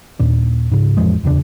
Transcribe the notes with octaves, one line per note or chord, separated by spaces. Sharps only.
D#2 A#2 D4
G#2 C#3
A1 F2 F3 G#3
D1 E2 C#3 D4